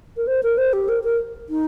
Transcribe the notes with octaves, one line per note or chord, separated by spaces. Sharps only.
A#4
C5
A#4
C5
G4
A#4
A#4
D#4